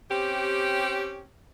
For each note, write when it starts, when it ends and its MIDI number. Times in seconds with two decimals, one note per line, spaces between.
0.10 1.30 60
0.10 1.30 61
0.10 1.30 67